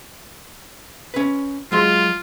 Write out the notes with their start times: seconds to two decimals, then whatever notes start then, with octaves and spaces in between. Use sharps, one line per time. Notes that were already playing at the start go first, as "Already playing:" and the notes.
1.14 C#4 B4
1.72 F#3 G#3 F4 C6